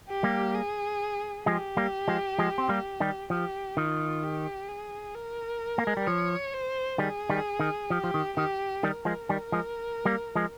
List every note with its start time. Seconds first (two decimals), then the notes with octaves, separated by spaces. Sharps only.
0.09 G4
0.23 G3 A#3
0.55 G#4
1.46 F3 G#3 G4
1.77 G3 A#3
2.08 F3 G#3
2.39 F3 G#3
2.58 C4
2.69 G3 A#3
3.00 D#3 G3
3.30 F3 G4
3.77 D#3 F4
4.23 G4
4.69 G#4
5.14 A#4
5.78 A#3
5.87 G#3
5.97 G3
6.07 F3 C#5
6.53 C5
6.98 D#3 G3 G#4
7.30 D#3 G3
7.60 D#3
7.90 F3 G4
8.04 F3
8.14 D#3
8.37 D#3 G4
8.83 D#3 G3 A#4
9.05 F3 G#3
9.29 D#3 G3
9.52 F3 G#3
10.05 G3 A#3
10.35 F3 G#3